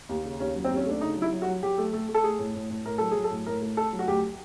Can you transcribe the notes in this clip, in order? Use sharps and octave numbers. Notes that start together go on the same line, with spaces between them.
D#2
C#3
D#2 C#4
F#3
C4
D#2
C#4
A3 D4
C#3 D#4
F#3
E4
F#3
F#4
F#3
F#3 G4
A3
A3
A3
A4
A3 G#4
A2
A2
A2
A2 A#4
F#3 A4
F#3 G#4
A4
A2
A2 A#4
A3
A3 A4
F#3
F#4
D2 G4